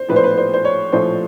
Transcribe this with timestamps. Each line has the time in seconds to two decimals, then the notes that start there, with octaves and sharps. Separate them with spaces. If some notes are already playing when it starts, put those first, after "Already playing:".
Already playing: C5
0.08 A#1 A2 F3 A3 B4
0.16 C5
0.24 B4
0.38 C5
0.54 C5
0.65 C#5
0.92 A#1 A2 F3 A3 C5